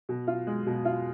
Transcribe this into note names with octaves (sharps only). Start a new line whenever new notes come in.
B2
F4
G#3
B2
F4